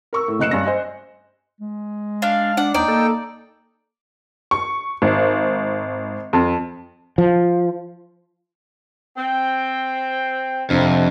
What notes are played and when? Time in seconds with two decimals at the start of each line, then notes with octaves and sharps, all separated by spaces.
0.13 A#4 C#6 E6
0.28 A2
0.39 F#1 D#5 F#6 C#7 E7
0.51 G2 C#4 A#6
0.65 C5 D#5 G#5
1.61 G#3
2.22 D4 F5
2.57 D4 F#5
2.74 D#2 D#4 D5 G5
2.88 A#3 A4
4.51 C#6
5.02 G#1
6.33 F2
7.18 F3
9.17 C4 G5
10.70 F2 C3 F3 D4